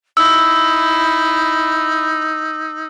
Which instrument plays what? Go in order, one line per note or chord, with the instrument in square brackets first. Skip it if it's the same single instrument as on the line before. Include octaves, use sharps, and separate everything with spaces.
[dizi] D#4 [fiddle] E4 [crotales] E6